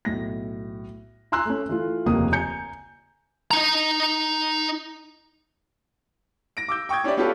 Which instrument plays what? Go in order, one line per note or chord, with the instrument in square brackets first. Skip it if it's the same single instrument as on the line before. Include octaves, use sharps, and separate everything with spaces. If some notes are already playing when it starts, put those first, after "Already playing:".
[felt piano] B1 A2 A#6
G#5 A#5 C6 E6 F#6
A3 C#4
E3 A3 F4
F1 D#2 C#3 A#3 D#6
G#5 A#5 G6 C#7
[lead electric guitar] D#4 A#5
[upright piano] A#6 D7
D6 E6 G6
G5 C#6 D#6 G6 G#6
C#4 D4 E4 G4 D5
B3 C#4 F4 G4 A4 B4